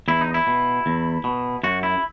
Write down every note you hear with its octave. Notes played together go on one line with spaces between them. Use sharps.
E2 E4
D#4
E4
B2
E2
B2
F#2 F#4
E4